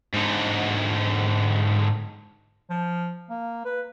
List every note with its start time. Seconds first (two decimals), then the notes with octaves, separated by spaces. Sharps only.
0.14 G#2 D3
2.70 F3
3.30 A#3
3.65 B4